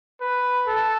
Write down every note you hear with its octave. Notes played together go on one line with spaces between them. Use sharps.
B4
A4